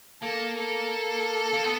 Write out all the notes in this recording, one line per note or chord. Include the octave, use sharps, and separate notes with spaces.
A#3 A4
A4
A#3
B3